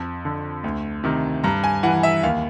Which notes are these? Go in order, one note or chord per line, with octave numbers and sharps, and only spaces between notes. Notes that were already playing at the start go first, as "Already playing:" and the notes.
Already playing: F2 A5
D3
D2
C3 D#3
G2 A#5
G#5
E3 F#5
E5
D#2 F5